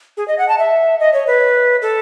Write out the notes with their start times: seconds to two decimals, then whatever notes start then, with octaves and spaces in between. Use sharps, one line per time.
0.17 G#4
0.28 D#5
0.39 F#5
0.49 A5
0.59 E5
1.00 D#5
1.14 C#5
1.27 B4
1.82 A4